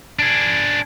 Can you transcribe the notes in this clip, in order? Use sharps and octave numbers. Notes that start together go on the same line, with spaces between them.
D4 G#4